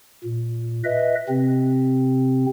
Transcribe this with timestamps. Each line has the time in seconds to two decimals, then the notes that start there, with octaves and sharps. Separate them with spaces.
0.24 A#2
0.84 B4 D#5 E5
1.28 C3 C4